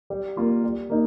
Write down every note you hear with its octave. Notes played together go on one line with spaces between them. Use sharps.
G3
A#3 F4 A#4
G3
A#3 D#4